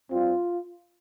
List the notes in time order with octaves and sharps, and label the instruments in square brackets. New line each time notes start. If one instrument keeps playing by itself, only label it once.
[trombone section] G2 G3 C4 F4